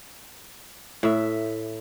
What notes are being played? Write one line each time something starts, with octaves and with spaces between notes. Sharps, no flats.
A2 E5